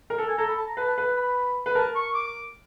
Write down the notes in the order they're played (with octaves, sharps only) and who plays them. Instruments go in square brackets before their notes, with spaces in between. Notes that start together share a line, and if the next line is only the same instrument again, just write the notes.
[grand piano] A#4
A4
[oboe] G#5
[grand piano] A4 [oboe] A#5
[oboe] B5
A5
A#5
[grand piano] B4 [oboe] A5
[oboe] A5
[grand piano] B4
[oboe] B5
[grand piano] B4
[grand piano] A#4 [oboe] A5
[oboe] C#6
D6